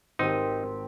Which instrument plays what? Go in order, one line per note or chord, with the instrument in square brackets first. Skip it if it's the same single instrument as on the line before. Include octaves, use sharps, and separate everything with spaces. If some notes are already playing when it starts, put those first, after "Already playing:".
[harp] G#1 D#6 [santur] C4 G4 [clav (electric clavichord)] D#4